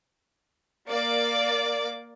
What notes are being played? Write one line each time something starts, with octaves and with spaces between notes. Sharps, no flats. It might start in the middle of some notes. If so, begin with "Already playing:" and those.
A#3 D5 D6